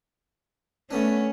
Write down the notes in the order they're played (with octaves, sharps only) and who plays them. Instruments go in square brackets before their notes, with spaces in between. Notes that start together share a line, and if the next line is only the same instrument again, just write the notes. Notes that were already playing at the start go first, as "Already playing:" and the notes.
[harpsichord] A3 B3 D4 [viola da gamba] C#4